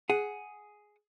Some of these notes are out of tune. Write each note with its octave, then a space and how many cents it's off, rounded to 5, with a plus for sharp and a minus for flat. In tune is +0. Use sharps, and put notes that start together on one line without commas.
G#4 +5 F#5 +0